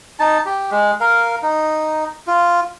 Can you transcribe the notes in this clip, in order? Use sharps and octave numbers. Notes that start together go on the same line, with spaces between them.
D#4 A5
G4
G#3
A#4 F5
D#4
F4